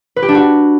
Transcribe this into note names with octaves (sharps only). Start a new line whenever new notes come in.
B4
G4
D4
F#4